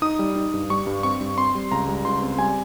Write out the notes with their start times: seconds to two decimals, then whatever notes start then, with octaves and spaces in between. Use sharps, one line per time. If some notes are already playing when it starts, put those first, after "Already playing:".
0.02 D#4 D#6
0.19 G3
0.36 D#4
0.54 G2
0.70 G3 C#6
0.87 G2
1.03 C4 C#6
1.21 G2
1.37 C4 C6
1.55 G3
1.71 C#2 A#5
1.88 G3
2.05 C#2 C6
2.22 C4
2.39 G3 G#5